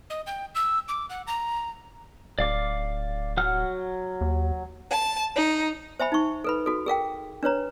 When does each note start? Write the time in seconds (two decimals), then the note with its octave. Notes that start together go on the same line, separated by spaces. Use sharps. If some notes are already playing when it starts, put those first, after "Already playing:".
0.10 D#5
0.27 G5
0.55 E6
0.88 D6
1.10 F#5
1.27 A#5
2.39 D1 D5 F5 D6
3.37 F#3 F#5 F6
4.21 D#2
4.90 A5
5.35 D#4
6.00 C5 E5 G#5 B5
6.12 D#4 C#6
6.44 A4 B4 B5
6.66 F#4 A4
6.86 G#4 A#4 F5 G5
7.43 D4 B4 C#5 A#5